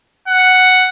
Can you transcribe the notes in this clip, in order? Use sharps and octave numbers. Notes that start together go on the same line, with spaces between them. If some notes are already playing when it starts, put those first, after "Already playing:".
F#5